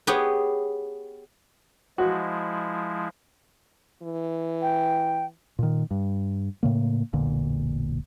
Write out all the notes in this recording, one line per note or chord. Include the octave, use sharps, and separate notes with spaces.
B3 G4 G#4 C#5
F3 G#3 E4 F#4
E3
G5
A#2 D#3
G2
A2 C#3 A#3
E1 B1 A#2 D3